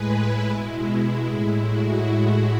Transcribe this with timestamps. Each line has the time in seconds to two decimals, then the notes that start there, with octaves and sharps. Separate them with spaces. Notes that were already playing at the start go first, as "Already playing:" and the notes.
Already playing: A2 G#3 G#4 B4
0.10 E4 G#4
0.49 B2 G#3 E4
0.87 E4
1.25 A2 G#3
1.64 F#4